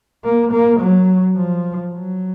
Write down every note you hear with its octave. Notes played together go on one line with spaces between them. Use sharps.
A#3
A#3
F#3
F3
F#3